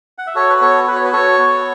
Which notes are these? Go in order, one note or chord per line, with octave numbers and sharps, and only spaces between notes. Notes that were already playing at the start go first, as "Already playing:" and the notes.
F#5
E5
F#4 A4 C#5
B4
B3 A4 C#5
F#4 B4
C#5
B4
F#4 A4 C#5
B3